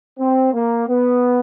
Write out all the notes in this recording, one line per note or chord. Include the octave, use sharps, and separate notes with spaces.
C4
A#3
B3